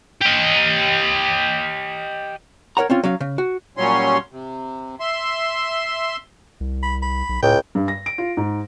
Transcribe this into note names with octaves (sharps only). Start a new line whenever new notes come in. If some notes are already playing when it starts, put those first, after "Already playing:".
G4 D#5
A#4 C#5 F#5 A#5
C4 C#4 F4
F#3 C#4 F5
C#3
F#4
A#2 F#3 G3 C#4 C#5 C6
C3
E5 C6
C2
B5
B5
B1
C#2 A2 G5
G2
A#6
D7
F4
G#2